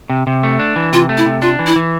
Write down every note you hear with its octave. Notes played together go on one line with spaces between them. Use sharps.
C3
C3
A3
D4
E3
C3 F4
A3
E4
C3
D4 F4
E3
E4
E3